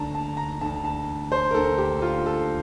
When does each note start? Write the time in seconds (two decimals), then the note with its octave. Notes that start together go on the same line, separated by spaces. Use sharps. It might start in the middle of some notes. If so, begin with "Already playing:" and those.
Already playing: D2 D3 A5 A#5
0.15 A5
0.37 A#5
0.61 D2 D3 A5
0.84 A5
1.32 C5
1.51 A#4
1.54 D2 D3 A4
1.78 G4
2.02 F4
2.26 A4